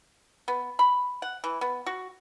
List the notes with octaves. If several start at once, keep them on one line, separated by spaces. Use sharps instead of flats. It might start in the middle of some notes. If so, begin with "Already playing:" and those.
B3
B5
F#5
E3
B3
F#4